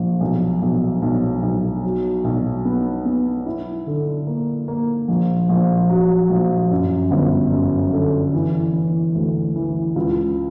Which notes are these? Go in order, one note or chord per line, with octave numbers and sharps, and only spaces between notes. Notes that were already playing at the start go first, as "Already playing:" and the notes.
Already playing: A#1
B1
B1
B1
B1
F#3
B1
B3
B3
E4
D3
A#3
A#3
A#1
A#1
F#3
A#1
F#2
G1
F#2
D3
E3
E3
D2
E3
C#2